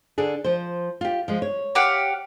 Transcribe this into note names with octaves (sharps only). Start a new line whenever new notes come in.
D3 D4 G#4
F3 C5
F4 G4
F3 G#3
C#5
G4 F5 F#5